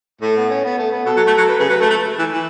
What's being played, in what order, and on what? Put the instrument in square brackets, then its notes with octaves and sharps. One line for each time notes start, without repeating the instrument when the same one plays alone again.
[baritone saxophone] A2 [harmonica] A3
[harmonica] B3
C#4
B3
A3
B3
[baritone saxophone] B2 [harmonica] A4
[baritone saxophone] F#3
A3
F#3
[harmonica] B4
[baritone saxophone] C#3 [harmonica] B4
[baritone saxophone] F#3 [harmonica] B4
[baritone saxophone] A3 [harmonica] A4
[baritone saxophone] A3
E3
E3